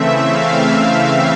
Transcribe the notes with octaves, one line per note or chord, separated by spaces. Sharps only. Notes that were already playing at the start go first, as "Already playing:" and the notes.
Already playing: C#3 E3 A3 C4 E5
F5
F5